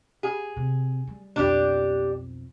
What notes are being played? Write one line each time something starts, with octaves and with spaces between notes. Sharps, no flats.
G#4
C3
G3
B1 F2 D4 G4